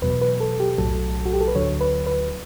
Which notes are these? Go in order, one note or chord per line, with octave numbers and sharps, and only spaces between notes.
E2 B2 F#3 B4
B4
A4
G4
B1 A2 F#3 A4
F#4
G4
A4
B4
D2 D3 F#3 C#5
B4
B4